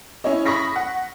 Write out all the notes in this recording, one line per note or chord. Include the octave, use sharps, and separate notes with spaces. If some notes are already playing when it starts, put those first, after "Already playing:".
C#4 E4 C#5 D#5
B5 C#6 D#6 A#6 B6
F#5